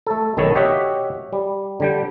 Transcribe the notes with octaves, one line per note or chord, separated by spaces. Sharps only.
A3 A4
B1 D#3 B3 A4 C#5 A5
F#4 G4 C#5 D#5 E5 F#5
G3
D3 G3 G5